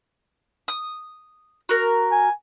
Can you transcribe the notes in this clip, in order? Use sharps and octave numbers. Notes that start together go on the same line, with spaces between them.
D#6
F#4 A#4
G#5